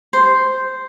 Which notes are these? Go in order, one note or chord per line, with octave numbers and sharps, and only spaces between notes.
C5